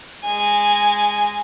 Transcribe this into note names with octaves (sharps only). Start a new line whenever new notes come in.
G#3 G#5